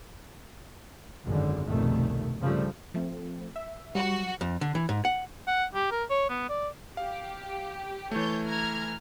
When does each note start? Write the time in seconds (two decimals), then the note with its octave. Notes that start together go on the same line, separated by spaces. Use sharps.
1.25 G#1 F#2 D3
1.67 F1 C2 B2 D#3 A3
2.39 G2 C#3 F3 G3 A3
2.94 F3 A3 C4
3.56 E5
3.95 F#3 G3 F#4
4.41 F2
4.61 D3
4.75 E3
4.89 G#2
5.05 F#5
5.47 F#5
5.74 G4
5.91 A#4
6.10 C#5
6.29 B3
6.49 D5
6.97 G4 F5
8.11 E3 A3 C#5 G6 A6
8.46 A#5 F6 G#6